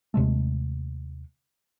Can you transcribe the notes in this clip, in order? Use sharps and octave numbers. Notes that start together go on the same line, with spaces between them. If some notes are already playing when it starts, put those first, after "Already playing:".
D#2 C3 G#3 A3